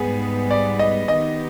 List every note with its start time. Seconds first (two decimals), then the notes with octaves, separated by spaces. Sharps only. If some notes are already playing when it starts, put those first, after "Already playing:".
Already playing: G#2 G3 B3 G#4
0.51 D5
0.79 D#5
1.08 D#3 B3 D#4 G4 D#5